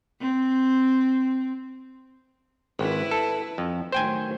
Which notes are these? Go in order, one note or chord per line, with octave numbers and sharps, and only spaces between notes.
C4
G#1 E4 B4
A4
F2
A2 D#3 F#3 C5 G5 G#5